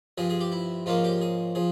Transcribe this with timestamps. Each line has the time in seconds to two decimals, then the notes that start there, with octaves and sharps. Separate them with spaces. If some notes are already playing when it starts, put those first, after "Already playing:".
0.18 G2 F3 C4 G#4
0.30 G#4
0.41 G4
0.52 E4
0.86 G#2 F3 A#3 C#4 F4
1.04 G4
1.21 G#4
1.55 F3 G#4